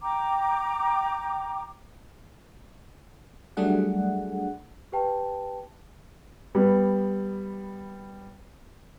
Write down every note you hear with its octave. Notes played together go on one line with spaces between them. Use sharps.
G5 A#5 D6
F#3 G3 A3 D4 G#4 F#5
G4 B4 G5 A5
G3 B3